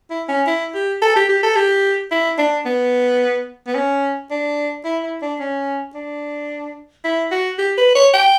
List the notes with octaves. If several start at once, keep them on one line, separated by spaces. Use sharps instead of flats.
E4
C#4
E4
G4
A4
G4
G4
A4
G4
E4
D4
B3
B3
C#4
D4
E4
E4
D4
C#4
D4
E4
F#4
G4
B4
C#5
G5